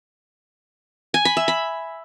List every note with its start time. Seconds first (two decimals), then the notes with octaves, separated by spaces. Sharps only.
1.14 G#5
1.25 B5
1.37 E5
1.48 B5